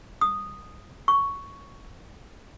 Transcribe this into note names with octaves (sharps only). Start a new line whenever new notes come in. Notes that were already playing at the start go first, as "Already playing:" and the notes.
D#6
C#6